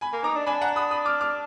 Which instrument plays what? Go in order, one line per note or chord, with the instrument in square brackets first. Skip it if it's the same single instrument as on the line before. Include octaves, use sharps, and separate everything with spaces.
[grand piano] G#5 B5
[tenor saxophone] A#3
[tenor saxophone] D#4 [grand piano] A#5 D6
[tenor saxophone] D4
[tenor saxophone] D4 [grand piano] G#5 B5
[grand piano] F#5 A#5
B5 D#6
B5 D#6
D6 F6
D6 F6